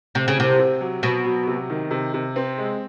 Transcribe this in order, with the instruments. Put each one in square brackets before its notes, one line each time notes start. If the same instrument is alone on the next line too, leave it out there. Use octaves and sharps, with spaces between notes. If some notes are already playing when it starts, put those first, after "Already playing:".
[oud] C3 [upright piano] A3
[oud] C#3
[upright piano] C2 [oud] C3
[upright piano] C3
F#3
[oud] B2 [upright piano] F#3
[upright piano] F#3
C3
D#3
C3
C3
C4
G#3